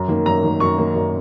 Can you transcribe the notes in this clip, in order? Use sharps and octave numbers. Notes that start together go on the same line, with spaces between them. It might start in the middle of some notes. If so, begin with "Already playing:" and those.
Already playing: F#2
D#3 A#3
F#2 A#5
D#3 A#3
F#2 C#6
D#3 A#3
F#2